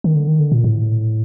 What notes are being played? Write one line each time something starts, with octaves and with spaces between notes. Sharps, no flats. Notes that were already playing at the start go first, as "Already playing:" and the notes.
D#3
D3
D#3
D3
A#2
A2